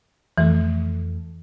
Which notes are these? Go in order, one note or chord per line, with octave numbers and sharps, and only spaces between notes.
F2 E3 A3